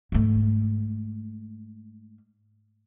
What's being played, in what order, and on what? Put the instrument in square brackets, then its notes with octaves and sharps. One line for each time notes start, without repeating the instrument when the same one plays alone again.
[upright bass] G#2 A3